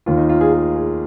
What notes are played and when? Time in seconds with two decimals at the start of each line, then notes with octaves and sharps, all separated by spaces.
0.06 D#2 D#3 F4
0.17 D#4
0.29 F4
0.41 G#4
0.52 G#4
0.75 G#4